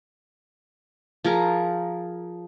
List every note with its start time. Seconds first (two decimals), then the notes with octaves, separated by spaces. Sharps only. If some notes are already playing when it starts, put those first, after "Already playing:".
1.24 F3 G#4 A#4